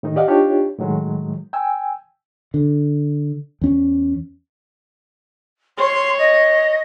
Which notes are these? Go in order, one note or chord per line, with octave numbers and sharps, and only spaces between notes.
A2 D#3 D#4
G4 D5 D#5 F5 F#5
D4 D#4 F4 G4 C#5
A2 D#3 F#3 G#3
G5 G#5 E6
D3
E2 C#4
C#5 C6
D#5